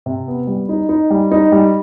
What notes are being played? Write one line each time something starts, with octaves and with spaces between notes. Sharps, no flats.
C3
B3
G3
D#4
D#4
G3
D#4
G3